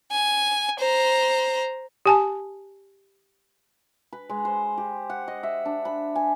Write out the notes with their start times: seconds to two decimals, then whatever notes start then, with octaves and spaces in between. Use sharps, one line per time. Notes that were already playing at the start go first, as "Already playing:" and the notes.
0.11 G#5
0.79 C5 A#5
2.06 G4 G#5 A5
4.13 B4
4.30 G#3
4.45 C5
4.78 G4
5.10 F#5
5.28 D#5
5.43 E5
5.65 D4
5.85 B5
6.16 G#5